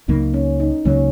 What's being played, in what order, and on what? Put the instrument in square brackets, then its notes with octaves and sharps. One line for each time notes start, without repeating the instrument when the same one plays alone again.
[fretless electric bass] C#2 C#3 F#3 A#3 [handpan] D#4
[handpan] C#4
D#4
[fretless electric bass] C#2 C#3 F#3 A#3 [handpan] C#4